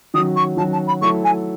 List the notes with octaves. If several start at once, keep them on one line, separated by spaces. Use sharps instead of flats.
D#3 F#3 C#4 F#4 D#6
C#6
D#3 F#3 C#4 F#4 A5
A5
B5
F#3 A3 E4 A4 C#6
G#5